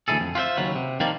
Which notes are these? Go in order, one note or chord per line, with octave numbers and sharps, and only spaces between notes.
D2 E3 E4 G#4 A4
F2
F4 G4 B4 C5 E5
D#2 C#3 F#3 B4
C3
D#3 F3 G3 A#3 D4